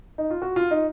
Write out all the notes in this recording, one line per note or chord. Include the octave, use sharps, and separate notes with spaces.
D#4
F4
F#4
F4
D#4